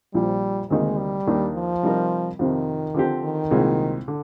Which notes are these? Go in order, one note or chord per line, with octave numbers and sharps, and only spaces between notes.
A#1 A#2 F3 G3
D2 C3 D#3 G#3 A#3 D#4
G3
D#2 D#3 A#3 D4
F3
C3 G3 C4 D#4 A#4
F2 C3 D#3 F3
D3 F3 C4 G4
D#3
C2 A#2 G#3 C4
D3